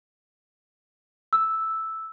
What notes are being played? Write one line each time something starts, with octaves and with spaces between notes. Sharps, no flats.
E6